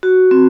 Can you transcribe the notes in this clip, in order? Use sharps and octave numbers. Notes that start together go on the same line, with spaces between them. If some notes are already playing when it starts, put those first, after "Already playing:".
F#4
C4